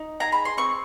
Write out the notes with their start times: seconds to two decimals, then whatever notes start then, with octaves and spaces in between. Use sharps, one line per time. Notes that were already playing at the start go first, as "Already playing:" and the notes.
Already playing: D#4
0.20 G#4 A#5
0.32 B5
0.45 C6
0.57 C4 C#6